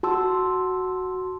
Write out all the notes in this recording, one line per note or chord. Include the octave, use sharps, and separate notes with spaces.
F#4 A5 C6 E6